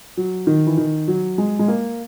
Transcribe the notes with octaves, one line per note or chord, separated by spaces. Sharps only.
F#3
D#3
E3
D#3
F#3
G#3
G#3
A#3